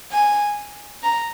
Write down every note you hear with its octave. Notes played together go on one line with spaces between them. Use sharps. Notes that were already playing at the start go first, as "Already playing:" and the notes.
G#5
A#5